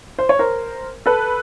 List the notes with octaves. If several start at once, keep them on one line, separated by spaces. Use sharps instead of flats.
C5
C#5
A#4 C5
A4 B4